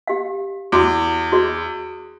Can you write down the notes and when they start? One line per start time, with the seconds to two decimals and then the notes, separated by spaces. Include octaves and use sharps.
0.07 G4 F5
0.72 E2 F#4 D6
1.32 F#4 G#4 D5